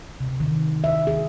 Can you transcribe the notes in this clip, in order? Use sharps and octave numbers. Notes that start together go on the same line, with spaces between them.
C3
D#3
E5
G#4